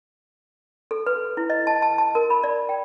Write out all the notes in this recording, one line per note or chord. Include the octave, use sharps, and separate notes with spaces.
A4
B4
E4
D#5
A5
A5
A5
A#4
B5
D5
G5